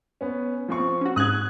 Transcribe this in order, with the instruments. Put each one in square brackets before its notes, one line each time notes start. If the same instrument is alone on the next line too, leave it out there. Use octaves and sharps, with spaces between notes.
[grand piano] B3 C#4
F3 C4 C#6
[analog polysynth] C#4 F#4
[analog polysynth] G#2 F#6 [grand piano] D#6 G#6